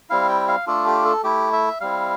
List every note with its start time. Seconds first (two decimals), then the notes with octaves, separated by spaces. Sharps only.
0.10 G3 C4 E4 F5
0.29 G5
0.48 F5
0.67 A3 D4 F4 A4
0.87 G4
1.05 A4
1.23 A3 E4 G4
1.53 E5
1.81 G3 C4 E4 F5